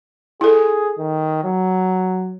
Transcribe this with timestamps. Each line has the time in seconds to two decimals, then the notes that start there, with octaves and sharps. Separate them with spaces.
0.41 E4 G#4 A4
0.99 D#3
1.44 F#3